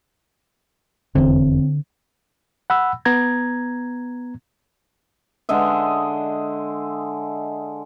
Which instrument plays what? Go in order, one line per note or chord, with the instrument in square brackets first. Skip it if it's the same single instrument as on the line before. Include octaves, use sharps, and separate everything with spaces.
[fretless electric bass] F1 E2 [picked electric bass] D3 [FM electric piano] C4
[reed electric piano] F#5 B5 E6
B3 A#5 G#6
[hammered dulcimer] D3 G#3 D#5 E5